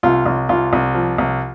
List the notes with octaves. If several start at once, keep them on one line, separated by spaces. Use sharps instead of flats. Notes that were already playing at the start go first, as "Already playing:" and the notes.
C2 F4
C2
C2 F4
C2
F3
C2